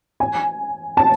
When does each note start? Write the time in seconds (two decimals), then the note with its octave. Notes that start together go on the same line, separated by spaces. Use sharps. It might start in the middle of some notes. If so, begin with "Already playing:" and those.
0.20 G#5
0.97 A5